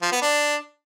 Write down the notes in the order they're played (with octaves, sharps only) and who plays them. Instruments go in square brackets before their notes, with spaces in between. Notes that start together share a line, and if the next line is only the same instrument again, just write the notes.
[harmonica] F3
B3
D4